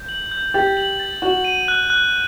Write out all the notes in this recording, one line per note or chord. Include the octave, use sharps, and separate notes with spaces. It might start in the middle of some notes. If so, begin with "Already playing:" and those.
Already playing: G6
F#7
G6
G4 A6
F#7
A6
F#4 F#7
D#7
F#6
F#6